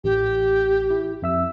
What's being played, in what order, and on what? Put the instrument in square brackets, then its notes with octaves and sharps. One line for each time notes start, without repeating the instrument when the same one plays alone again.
[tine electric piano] A1 [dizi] G4
[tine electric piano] E4
F2 E5 E6